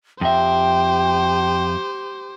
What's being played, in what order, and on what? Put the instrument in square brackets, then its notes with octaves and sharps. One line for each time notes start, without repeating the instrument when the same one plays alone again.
[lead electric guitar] F2 E5 [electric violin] G4 C5 [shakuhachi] G5